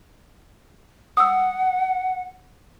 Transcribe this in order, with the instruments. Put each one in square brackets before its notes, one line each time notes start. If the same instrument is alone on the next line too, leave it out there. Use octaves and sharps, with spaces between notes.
[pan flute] F#5 [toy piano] D#6 E6